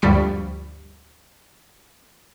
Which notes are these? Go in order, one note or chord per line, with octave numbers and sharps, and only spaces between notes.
D2 G2 F3 G3 B5 C#6